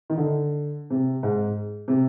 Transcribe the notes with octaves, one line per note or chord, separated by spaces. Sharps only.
D#3
D3
C3
G#2
C3